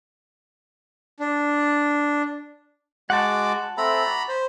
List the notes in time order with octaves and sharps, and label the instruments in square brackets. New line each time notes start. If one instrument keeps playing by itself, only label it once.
[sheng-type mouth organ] D4
[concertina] G#3 F#4 D6 [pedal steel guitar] F#5 A5
[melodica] A3 C4 A4 [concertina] A#5 B5
[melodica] F#4 D5
[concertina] C5 [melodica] B5